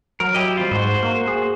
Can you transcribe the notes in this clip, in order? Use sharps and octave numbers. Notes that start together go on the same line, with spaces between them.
F#3 A#4
E4 G4 D#5
G3 C4 F4
G#2 F#4 C5
A#3
G#4